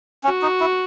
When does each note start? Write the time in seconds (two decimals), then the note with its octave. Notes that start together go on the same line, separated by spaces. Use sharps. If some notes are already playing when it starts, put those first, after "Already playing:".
0.24 C#4 F#4
0.42 D#4
0.60 E4